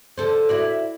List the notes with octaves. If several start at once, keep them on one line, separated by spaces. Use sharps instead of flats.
D3 A4 C5
E4 F#4 D5